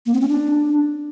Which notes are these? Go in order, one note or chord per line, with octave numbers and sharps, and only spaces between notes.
A#3
C4
C#4
D4